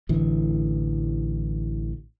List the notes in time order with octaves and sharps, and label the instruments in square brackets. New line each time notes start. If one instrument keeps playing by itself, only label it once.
[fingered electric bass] A1 D3 E3